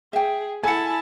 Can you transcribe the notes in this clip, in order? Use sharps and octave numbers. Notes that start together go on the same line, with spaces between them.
G#4 E5 G5
E4 A4 F#5 G#5 A5